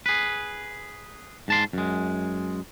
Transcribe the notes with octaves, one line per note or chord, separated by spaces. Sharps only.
G#4 B4
G#2 A5 C6
F#2 G#3